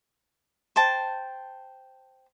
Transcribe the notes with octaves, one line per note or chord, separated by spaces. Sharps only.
C5 G5 A5